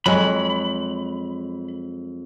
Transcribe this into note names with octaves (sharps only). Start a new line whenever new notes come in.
F2 F#3 G#3 B5